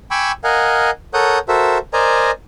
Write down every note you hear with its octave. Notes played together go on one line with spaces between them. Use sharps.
G5 G#5 B5 C#6 D6 E6
A#4 D#5 F5 F#5 G#5
A4 A#4 C#5 F#5 D#6 G6
F#4 A4 A#4 C5 E5
A#4 C5 D5 D#5 G#5 A#5